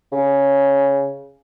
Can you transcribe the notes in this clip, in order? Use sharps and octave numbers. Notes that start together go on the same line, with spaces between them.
C#3